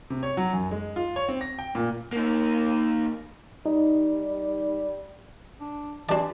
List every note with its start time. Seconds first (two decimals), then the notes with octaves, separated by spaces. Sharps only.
0.10 C3
0.23 C#5
0.37 F#3
0.53 F#2
0.71 G#3
0.96 F4
1.16 C#5
1.29 C4
1.41 A#6
1.59 G5
1.75 A#2
2.13 A#3 D#4
3.66 G3 D#4
5.60 D4
6.09 E3 D4 F#4 G4 D5 A5